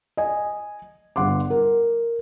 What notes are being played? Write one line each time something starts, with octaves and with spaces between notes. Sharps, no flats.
D#5 G#5
G1 F#5 C6 D6
A#4